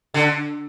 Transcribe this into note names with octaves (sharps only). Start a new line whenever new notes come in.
D3